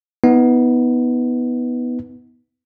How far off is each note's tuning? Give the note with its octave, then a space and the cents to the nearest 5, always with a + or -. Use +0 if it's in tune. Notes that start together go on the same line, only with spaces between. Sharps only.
B3 +0 D#4 +35